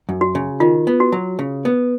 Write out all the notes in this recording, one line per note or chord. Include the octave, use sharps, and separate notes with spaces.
F#2
F#4
C#3
D#3 F4
B3
F#4
F#3
C#3
B3